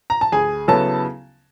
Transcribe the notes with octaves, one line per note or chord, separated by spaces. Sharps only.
A#5
A5
D2 G#4 G#5
C#3 F#3 B3 E4 A4 A5